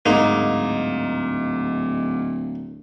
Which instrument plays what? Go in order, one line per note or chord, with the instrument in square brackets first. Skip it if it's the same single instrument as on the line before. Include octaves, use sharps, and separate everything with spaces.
[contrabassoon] D1 [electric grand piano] G#2 [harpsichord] A#3 D#4